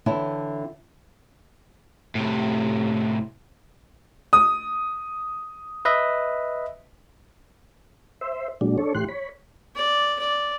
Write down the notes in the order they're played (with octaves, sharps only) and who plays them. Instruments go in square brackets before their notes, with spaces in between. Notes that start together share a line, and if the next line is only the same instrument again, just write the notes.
[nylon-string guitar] D3 E3 C4 E4 C#5 A5
[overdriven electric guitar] A2 C3
[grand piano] D#6
[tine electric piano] B4 D#5 E5
[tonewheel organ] C5 E5
A#2 F#3 G#3 D4
D4 A4 C#5
A2 E3 G4 C6 F#6
C#5 B5
[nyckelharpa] D5
D5